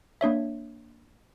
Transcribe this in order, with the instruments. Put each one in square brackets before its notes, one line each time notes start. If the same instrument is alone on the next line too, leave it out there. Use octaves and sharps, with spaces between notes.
[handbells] A#3 D4 C#5 E5